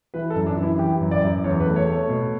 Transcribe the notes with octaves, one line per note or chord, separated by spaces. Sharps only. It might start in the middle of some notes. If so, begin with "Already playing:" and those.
E3 B4
A4
F#2
D4
E3
E4
E3 G4
F#2
D5
F#2
E2 C#5
B4
A3
C#5
A3
C#5
B2